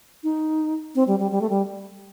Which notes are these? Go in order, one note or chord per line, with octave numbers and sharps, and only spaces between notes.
D#4
C4
G3
G3
G3
A3
G3